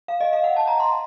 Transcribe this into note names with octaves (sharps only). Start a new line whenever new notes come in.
F5
D#5
F5
F#5
A5
A#5
C6